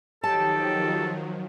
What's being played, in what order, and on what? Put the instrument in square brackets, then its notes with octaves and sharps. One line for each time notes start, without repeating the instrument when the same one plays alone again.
[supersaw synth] D#3 F3 F#3 [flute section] D#4 G4 C#5 [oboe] A4 [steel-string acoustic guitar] A5